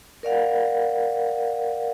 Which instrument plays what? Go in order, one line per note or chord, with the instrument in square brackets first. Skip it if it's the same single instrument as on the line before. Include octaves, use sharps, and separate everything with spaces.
[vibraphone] A#4 D5 F5 F#5